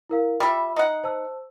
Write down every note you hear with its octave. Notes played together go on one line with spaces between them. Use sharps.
E4 A#4 F5
G3 F4 E5 B5 E6
D#4 F#5
C5 A5 E6